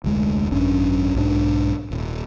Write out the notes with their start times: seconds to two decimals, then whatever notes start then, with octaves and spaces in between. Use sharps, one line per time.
0.04 F1 D2 G#3
0.51 G#1 F#2 C#4 D4
1.15 B1 G#2 D4
1.91 D#1